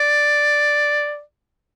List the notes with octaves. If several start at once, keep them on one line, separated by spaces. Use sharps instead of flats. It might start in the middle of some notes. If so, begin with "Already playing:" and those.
Already playing: D5